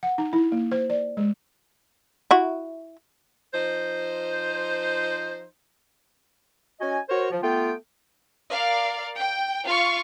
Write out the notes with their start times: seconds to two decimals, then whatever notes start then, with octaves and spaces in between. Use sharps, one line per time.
0.03 F#5
0.18 D#4
0.33 E4
0.52 A#3
0.72 C5
0.90 D5
1.17 G#3
2.31 E4 F#4
3.54 F3 D#4 C5
6.81 C#4 F#4 D#5 G#5
7.10 F#4 A#4 C5 C#5
7.31 F3
7.43 A3 B3 F4 G5
8.50 A#4 D5 F5
9.15 G5
9.65 F4 F5 C#6